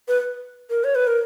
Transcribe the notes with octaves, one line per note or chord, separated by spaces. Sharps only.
B4
A#4
C#5
B4
A#4